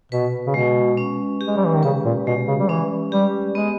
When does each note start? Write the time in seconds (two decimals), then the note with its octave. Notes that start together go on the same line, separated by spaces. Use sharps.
0.12 B2 B4
0.47 C#3
0.54 B2 G#3
0.97 C#4
1.41 G4
1.47 G#3
1.57 G3
1.66 E3
1.75 D#3
1.83 C#3 B4
2.05 A#2
2.27 B2 G#3
2.47 C#3
2.59 G3
2.69 E3 C#4
3.12 G3 G4
3.55 G#3 B3